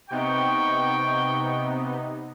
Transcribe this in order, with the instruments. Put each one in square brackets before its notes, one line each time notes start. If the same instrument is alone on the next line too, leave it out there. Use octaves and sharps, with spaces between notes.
[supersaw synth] C3 B3 D#4 [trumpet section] G5 C#6